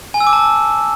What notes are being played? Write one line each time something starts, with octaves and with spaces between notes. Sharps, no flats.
G#5
E6
D6
A5